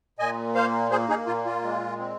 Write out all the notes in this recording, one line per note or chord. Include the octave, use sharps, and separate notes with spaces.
A#2 D#5 G#5
A#3 C5 F5
A#3 G#4 C5
D#4 G#4
A#2 F4
F4
G#3
C4